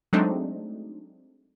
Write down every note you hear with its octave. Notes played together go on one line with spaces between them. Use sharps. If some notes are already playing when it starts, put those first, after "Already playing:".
F#3 G#3 A3 C4 D4 D#4